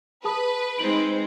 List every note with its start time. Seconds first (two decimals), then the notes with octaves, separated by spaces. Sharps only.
0.24 G#4 B4 A5 D#6
0.78 G#3 C4 D#4 D7 F#7